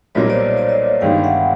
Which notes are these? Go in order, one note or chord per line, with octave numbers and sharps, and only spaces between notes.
B1 A#2 G3 A#3 C#5 D#5
C5 D5
C5 D5
C#5 D#5
G1 G2 D#3 G#3 F5 G5
E5 F#5